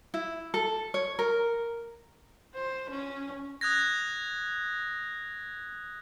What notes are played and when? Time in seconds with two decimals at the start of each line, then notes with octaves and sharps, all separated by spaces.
0.14 E4
0.54 A4
0.94 C#5
1.19 A#4
2.55 C5
2.90 C#4
3.61 D#6 F#6 G#6 A#6